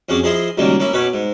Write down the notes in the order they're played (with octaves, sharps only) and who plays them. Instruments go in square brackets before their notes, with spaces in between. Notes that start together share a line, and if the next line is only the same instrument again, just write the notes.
[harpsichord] F2 C#4 F#4 G#4 D6
F3 E4 G#4 D#5 C6
C#2 D#3 F#3 G3 A#3
A#3 C#4 E4
B2 C#4 B4 C#5 D6
G#2